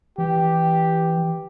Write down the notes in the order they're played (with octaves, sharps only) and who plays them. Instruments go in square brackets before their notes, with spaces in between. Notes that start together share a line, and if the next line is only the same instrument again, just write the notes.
[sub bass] E3 [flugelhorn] G4